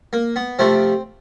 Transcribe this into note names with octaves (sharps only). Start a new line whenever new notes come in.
A#3
B3
C3 F3 A3 C4